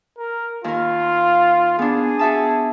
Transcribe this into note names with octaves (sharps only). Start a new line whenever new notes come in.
A#4
D#2 F4 A#4
B3 D4 G#4
F#4 E5 A5